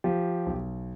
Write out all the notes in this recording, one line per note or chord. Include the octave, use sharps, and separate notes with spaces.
F3 G4
B1